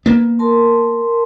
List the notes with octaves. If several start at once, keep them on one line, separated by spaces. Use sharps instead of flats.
A#3 B3
A#4 A5 C6